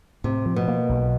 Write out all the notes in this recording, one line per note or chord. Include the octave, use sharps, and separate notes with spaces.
A2 C3
F3
B2
A#3
B1